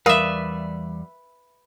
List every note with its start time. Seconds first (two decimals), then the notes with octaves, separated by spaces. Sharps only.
0.06 E2 G3 A#4 B4 D5 E5 F5 D#6